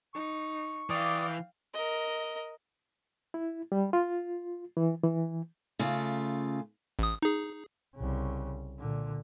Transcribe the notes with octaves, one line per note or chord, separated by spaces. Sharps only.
D#4 C#6
E3 D5 F5 G5 D6 D#6
A#4 D#5
E4
G3
F4
E3
E3
C#3 A3 F4
A1 D#6
D#4 G#4
C2 C#3
A#2 D3